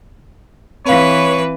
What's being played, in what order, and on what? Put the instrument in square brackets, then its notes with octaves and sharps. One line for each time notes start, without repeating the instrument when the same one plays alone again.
[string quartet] E3 B4 [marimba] C4 F5 [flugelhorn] C#5